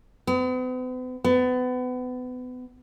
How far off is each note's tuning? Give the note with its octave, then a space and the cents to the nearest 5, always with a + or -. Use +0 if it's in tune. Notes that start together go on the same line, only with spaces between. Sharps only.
B3 +45
B3 +30